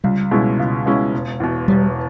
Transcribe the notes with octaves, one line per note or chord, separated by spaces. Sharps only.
C#2 G3
B2 G#3 C#4 E4
C#2
B2 G#3 C#4 E4
E1
E2 B2
E1 G3